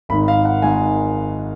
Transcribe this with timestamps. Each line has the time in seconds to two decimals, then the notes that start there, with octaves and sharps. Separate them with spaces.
0.09 G#1 B5
0.12 G#2 D#3
0.28 F5
0.45 F#5
0.62 G#1 G#2 D#3 G#5